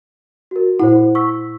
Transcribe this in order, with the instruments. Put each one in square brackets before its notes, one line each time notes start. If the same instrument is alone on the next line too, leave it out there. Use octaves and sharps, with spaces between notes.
[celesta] F#4 A#4
[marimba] A#2 E4 [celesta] C5 F#5
[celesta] C#6 E6 B6